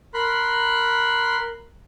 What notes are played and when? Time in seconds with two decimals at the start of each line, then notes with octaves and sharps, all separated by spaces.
0.14 A#4 B5 C6 F#6